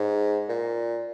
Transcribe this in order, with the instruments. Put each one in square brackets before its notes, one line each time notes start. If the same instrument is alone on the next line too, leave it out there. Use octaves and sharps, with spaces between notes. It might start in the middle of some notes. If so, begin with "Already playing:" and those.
Already playing: [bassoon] G#2
A#2